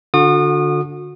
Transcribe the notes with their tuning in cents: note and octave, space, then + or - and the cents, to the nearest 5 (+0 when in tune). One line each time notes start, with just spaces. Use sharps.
D3 +0 F#4 -35 D#6 -30